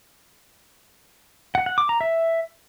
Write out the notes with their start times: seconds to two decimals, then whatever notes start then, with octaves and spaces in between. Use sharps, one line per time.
1.55 F#5
1.66 F#5
1.78 D6
1.89 A#5
2.01 E5